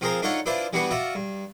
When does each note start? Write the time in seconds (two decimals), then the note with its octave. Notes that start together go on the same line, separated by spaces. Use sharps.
0.01 F3 C4 F4 G#4 A#4 C5
0.22 D4 D#4 F4 A4 C#5 F#5
0.46 D4 E4 F4 B4 C5 D5
0.73 E3 G3 B3 D4 F#4 B4
0.91 F4 F#4 D5 E5
1.15 G2